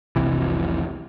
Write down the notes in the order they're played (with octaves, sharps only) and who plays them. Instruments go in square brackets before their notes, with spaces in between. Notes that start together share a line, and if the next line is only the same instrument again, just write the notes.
[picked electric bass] F1 C2 C3 E3